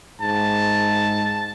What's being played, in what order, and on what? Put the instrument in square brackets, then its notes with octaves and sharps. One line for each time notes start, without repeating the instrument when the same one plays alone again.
[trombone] G#2 [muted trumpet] A5